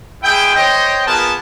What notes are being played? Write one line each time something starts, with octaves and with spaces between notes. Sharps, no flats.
G#3 E4 G#4 G5
C5 C#5 D#5 G5
A#3 B3 F4 G#4 A#4 A5